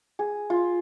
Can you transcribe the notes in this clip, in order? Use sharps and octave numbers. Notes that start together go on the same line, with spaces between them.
G#4
F4